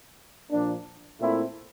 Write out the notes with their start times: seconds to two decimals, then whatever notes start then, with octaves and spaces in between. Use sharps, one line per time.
0.51 A#2 F3 A#3 D4
1.21 A#2 A3 C4 E4